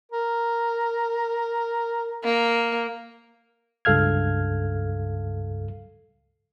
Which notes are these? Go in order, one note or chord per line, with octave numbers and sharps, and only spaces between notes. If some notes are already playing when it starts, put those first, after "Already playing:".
A#4
A#3
C#2 G2 A4 F5 F6 G#6